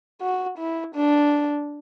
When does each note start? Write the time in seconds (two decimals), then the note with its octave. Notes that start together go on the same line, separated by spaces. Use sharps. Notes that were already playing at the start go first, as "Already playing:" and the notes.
0.21 F#4
0.59 E4
0.95 D4